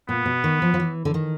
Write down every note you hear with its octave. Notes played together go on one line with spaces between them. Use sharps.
A#2 B3
B2
D#3
F3
F3
E3
D3
D#3